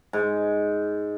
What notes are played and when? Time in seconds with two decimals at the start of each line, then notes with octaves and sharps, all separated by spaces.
0.13 G#2